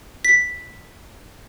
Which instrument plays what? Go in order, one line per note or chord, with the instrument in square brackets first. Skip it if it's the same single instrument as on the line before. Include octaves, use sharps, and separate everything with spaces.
[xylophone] B6